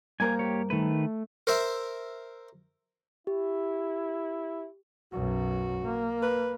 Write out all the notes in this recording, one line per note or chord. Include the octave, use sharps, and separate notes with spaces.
G2 A#3 A#4 C5 G#5
G4 C#5
D#3 A3 B4
A#4 C5 E5
E4 G4
B1 F#2 F#4
A#3
B4